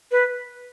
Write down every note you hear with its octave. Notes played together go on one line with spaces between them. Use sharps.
B4